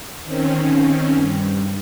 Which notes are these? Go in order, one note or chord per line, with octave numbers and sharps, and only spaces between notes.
D#3 C4 C#4
G2